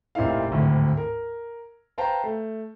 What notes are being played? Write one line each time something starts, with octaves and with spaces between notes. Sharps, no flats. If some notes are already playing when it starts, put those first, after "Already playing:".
F1 A#2 C4 D#4 E4 F5
G#1 D2 A2
A#4
B4 C5 F5 G5 A5 A#5
A3